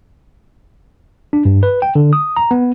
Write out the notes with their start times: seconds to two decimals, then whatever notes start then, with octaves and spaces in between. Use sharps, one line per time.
1.33 D4
1.45 G2
1.63 B4
1.82 G5
1.95 D3
2.13 D#6
2.37 A#5
2.51 B3